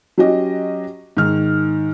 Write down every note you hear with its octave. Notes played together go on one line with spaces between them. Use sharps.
F#3 C#4 F#4 G4 D#5
G#2 D#3 F6